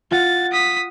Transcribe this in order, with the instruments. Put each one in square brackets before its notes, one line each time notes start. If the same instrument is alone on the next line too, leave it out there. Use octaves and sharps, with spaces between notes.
[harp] F4 F#5 [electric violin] A6
[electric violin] D#6 B6